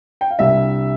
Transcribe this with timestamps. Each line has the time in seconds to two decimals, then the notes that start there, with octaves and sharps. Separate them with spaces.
0.21 G5
0.31 F5
0.39 C2 C3 G3 D4 E5